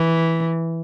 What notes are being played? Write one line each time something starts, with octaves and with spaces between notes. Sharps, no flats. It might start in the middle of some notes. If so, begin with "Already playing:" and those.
Already playing: E3